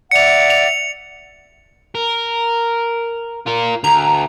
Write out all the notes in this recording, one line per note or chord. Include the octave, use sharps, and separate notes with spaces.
D5 E5 F#5 C#7 F7
F7
A#4
F4 A#4
D2 A#5